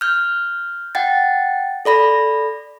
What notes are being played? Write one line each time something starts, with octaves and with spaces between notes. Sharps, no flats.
F6 G6
F#5 G5 A6
A4 D5 B5 A#6